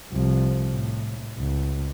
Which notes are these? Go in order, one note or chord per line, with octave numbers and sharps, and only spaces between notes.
C2 F3
A2
C#2